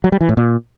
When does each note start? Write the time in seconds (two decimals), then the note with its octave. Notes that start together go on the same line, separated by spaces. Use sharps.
0.04 F#3
0.12 G3
0.21 E3
0.29 A2
0.37 A#2